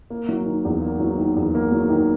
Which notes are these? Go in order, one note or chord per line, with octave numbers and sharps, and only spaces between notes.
A#3
F#3
D#3
E2
A#3
F#3
D#3
E2
A#3
F#3
D#3